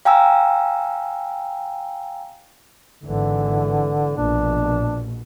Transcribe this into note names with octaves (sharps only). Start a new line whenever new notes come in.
F5 G5 G#5 A#5 E6
G#1 D3 E3
A#1 B2 D4